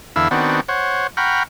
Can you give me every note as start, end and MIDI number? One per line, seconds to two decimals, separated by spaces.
0.16 0.28 40
0.16 0.28 50
0.16 0.28 64
0.16 0.28 77
0.16 0.28 88
0.31 0.61 51
0.31 0.61 59
0.31 0.61 60
0.31 0.61 62
0.31 0.61 66
0.68 1.07 72
0.68 1.07 73
0.68 1.07 78
1.17 1.43 78
1.17 1.43 79
1.17 1.43 82
1.17 1.43 83
1.17 1.43 85
1.17 1.43 89